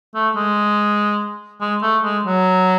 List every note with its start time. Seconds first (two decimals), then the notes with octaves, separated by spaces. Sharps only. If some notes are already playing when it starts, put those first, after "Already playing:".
0.15 A3
0.36 G#3
1.61 G#3
1.83 A3
2.03 G#3
2.25 F#3